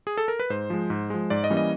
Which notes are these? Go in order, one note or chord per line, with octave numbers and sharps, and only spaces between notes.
G#4
A4
A#4
B4
G#2 C5
F3 G#3
G#2
F3 G#3
G#2 D5
D#5
E3 G3 A#3 C#4
D#5